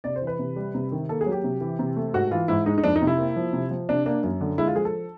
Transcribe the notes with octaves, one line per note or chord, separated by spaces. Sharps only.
C3 D5
C5
E3
B4
C3
G3
C3
D#3
A#3 A4
G#4
F#3
G4
C3
E3
C3
A3
G#2 F#4
E3 F4
G#2 E4
G#3 D#4
D#4
F2 D4
D#4
C3
E4
A#3
F3
C3
F3
C3 D4
A#3 D4
F#2
D3
G#3 E4
F4
F3 G#4
A4